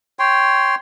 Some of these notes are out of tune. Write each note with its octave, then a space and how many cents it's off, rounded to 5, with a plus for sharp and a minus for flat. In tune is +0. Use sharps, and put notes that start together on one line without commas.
C#5 +0 G5 +0 C6 +0